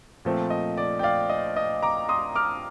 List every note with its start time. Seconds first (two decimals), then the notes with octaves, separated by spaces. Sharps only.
0.25 A#2 F3 A3 C4
0.50 D#5
0.78 D5
0.99 G5
1.03 D5 F5
1.29 D#5
1.56 D#5
1.83 A#5 D6
2.09 C6 D#6
2.35 D6 F6